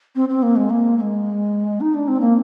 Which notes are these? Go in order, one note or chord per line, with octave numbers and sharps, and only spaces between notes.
C4
C4
A#3
G#3
A#3
A#3
G#3
D#4
D4
C4
A#3